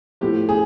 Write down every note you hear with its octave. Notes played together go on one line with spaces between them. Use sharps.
A2 F3 G4
G#4